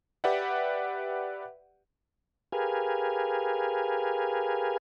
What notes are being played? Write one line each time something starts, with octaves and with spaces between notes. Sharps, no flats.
G4 B4 D5 E5 F#5
G4 G#4 A#4 B4 F5 G#5